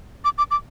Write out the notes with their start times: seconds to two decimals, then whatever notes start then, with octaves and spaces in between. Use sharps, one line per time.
0.24 D6
0.38 D6
0.51 D6